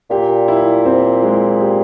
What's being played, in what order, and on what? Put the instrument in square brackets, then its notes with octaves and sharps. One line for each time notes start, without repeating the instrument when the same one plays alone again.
[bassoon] A#2 [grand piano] G4
[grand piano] E4
C4
G#3
G4